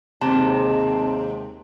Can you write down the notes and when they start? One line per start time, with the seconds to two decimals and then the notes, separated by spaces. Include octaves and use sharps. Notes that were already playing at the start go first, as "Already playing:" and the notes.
0.21 D#2 C3 G#3 C4 A5